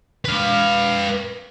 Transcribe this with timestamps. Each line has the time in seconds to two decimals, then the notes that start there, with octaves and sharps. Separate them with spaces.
0.25 B4 F5